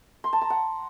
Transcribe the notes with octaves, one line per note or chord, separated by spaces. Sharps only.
C6
A5
A#5
F#5